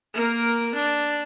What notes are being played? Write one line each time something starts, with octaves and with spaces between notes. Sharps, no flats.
A#3 A#4
D4